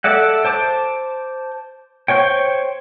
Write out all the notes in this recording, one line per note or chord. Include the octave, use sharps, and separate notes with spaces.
A4 D5 E5 F#5
C5 A5 D6
C5 C#5 G5